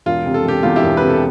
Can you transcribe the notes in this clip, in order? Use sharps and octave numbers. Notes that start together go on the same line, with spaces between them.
E1 F4
C3
A4
E1 G4
E2 F4
E4 G4
E1
C3 B4
A4